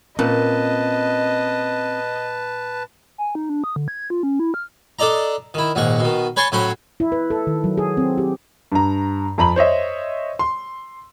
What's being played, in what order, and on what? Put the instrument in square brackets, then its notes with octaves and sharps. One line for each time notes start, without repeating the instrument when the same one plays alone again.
[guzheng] A#2 [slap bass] C4 C#4 [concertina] B4 A5 [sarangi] D#5
[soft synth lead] G#5
D#4
D4
D#6
D3
G#6
F4
C#4
E4
F6
[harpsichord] D4 A4 D5 D#5 A#5
D#3 E4
A#1 D#2 G#2 F#5 C#6
B2 D#3
B4 C#5 G#5 A5 C6 C#6
A2 F#3 C#4 C5 F#5 B5
[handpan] E4
B4
A4
D#3
F#3
G#4
C4
G4
[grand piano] G2 A#5
F2 A#5 B5 F#7
C5 C#5 D#5 E5
C6